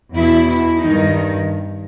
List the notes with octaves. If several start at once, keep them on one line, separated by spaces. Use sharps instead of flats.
E2 B2 E4
E4
G2 D#3 D#4